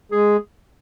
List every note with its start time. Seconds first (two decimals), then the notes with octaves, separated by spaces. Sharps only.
0.11 G#3 G#4